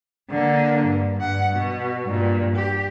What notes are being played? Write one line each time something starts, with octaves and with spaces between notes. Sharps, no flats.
D3 A#3
G2
G2 F#5
B2
G2 A#2
G4